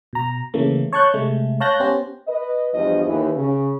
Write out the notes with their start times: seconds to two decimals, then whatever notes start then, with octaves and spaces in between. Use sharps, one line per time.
0.13 B2 A#5
0.54 C#3 E3 A3 A#3
0.93 C#5 A5 C#6 F#6 G6
1.14 C3 G#3 A3
1.60 C#5 F5 A5 F#6 G6 A#6
1.80 B3 C#4 G4 C5
2.27 B4 D#5
2.74 E2 G2 F3 B3 D#5
3.06 D#2 E3
3.35 C#3